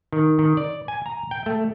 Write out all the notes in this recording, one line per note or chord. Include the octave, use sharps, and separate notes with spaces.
D#3
D#3
D5
G#5
A#5
G5
A3